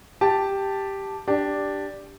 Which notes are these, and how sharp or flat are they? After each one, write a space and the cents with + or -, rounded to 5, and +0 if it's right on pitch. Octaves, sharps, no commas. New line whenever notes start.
G4 +0 A5 +0
D4 +0 G4 +0